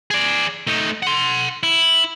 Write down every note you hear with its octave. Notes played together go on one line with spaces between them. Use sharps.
G#4 D5
A3 D#4
F#5 C6
E4